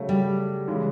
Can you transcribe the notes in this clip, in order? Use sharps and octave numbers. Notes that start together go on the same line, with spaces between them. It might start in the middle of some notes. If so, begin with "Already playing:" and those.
Already playing: C#3 F#3 A3
G3
C#3 E3 G#3